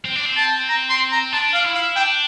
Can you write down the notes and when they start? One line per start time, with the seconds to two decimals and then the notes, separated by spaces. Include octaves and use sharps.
0.05 C4
0.16 D4
0.26 C4
0.37 A5
0.69 A#5
0.90 C6
1.12 A#5
1.33 D4 A5
1.54 F5
1.64 E4
1.74 F5
1.96 D4 G5